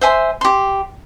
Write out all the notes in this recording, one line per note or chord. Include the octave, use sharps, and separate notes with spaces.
C5 E5 G#5 C6
G4 C6